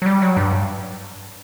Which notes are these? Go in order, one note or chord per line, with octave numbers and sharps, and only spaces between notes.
F#3
G3
F#3
G2